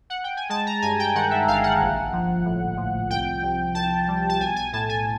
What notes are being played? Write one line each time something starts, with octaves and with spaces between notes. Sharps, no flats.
F#5
G5
G#5
G#3 A5
A#5
G2 G#5
G5
D#3 F#5
E5
G1 F5
F#5
A#1
F3
A2
F3
C2 G5
C2
C2 A5
G3
A5
B1 G#5
G#5
A2 A5
G#5